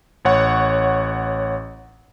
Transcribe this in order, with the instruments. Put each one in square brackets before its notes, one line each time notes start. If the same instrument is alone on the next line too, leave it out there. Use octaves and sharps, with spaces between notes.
[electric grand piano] A1 C#5 F#5 C#6